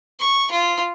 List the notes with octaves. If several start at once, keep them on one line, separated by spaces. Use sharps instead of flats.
C#6
F4